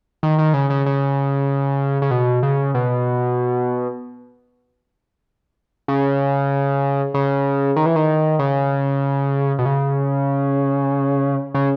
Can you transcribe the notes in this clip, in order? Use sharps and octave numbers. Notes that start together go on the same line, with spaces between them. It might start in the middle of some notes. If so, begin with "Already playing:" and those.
D#3
D#3
C#3
C#3
C#3
C#3
B2
C#3
B2
C#3
C#3
D#3
E3
D#3
C#3
B2
C#3
C#3